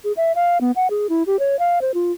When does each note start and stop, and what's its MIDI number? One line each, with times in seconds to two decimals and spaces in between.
0.04 0.12 68
0.17 0.32 76
0.35 0.58 77
0.61 0.71 59
0.76 0.88 78
0.90 1.07 68
1.09 1.23 64
1.27 1.39 67
1.39 1.59 73
1.59 1.81 77
1.82 1.92 72
1.94 2.12 65